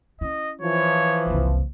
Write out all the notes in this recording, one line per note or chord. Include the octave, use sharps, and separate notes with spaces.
C#4 E4 D#5
E3 F3 C#5
F#1 C2